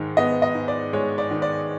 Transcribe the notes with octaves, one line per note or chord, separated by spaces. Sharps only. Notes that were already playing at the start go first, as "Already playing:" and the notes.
Already playing: G#2 D#3 G#3
B3 D#5
D#5
G#2
D5
G#3 C#5
D5
D#3
D5